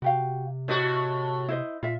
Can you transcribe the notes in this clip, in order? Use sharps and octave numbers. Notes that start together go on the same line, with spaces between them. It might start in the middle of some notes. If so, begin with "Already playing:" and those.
C3 F#4 G4 F5
A2 F#4 C5 D#5
E4 C5 D#5
A#2 F4 E5